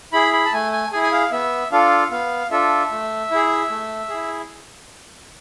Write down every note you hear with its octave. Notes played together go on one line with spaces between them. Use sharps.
E4 G#4 B5
B5
A5
A3 G#5
G#5
E4 G#4 G#5
G#5
F5
B3 E5
D4 F4 A4 F5
B3 F5
D4 F4 A4 E5
A3
E4 G#4
A3
E4 G#4